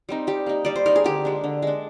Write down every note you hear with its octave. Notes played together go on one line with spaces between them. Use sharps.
G3 C4 D#4
G3 G4
A#3 D#4
G3 D5
C5
A#3 D#4 A#4
G#4
D3 G4
G#3 D4
D3
G#3 D4